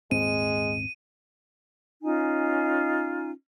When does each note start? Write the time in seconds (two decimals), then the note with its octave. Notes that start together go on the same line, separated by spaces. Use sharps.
0.11 D#1 G#2 G#3 C4 D#7
2.03 C#4 D#4 F4 G#5